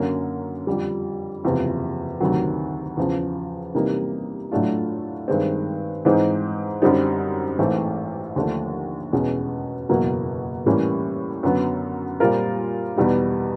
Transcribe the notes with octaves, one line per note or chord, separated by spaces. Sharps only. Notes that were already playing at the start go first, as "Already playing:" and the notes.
Already playing: F#2 D3 F#3 A#3 C#4
F2 D3 G3
F#1 E2 C3 F3
D2 C3 D#3 F#3
E2 C#3 F3
C3 E3 G3 A#3 D#4
A2 F#3 A3 D4 F4
G2 D#3 G#3 C4
G#2 E3 G#3 C4 D#4
F#2 D3 G3 C4 D#4
A1 G#2 E3 A3 C4
D#2 D3 F3 A3 D4
E2 B2 G#3 C#4
F#1 E2 B2 F#3 A#3
A2 E3 G3 A#3 C#4
F#2 D3 F#3 B3
A#2 G3 C4 F4 A#4
E2 B2 G3 B3 D#4